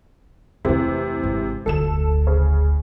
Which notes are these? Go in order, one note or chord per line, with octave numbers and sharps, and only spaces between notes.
F2 C3 E3 A3
G#1
F1 D2 A4 E7
C#3